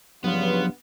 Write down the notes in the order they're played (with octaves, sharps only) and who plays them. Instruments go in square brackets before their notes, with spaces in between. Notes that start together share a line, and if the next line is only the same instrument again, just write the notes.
[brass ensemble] G2 C#3 F4 [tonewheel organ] F3 F#3 [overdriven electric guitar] B3